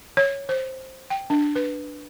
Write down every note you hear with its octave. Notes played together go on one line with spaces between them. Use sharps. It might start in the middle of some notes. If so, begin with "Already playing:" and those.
C#5
C5
G5
D4
B4